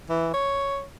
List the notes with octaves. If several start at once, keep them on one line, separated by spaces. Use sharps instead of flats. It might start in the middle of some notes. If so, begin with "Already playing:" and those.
E3
C#5